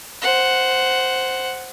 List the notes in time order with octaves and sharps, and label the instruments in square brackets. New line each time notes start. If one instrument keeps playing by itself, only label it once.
[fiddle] C5 F#5